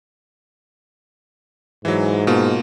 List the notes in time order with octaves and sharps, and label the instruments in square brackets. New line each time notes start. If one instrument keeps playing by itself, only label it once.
[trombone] G#2 [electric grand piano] E3 F#3
[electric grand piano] B2 A#3 F4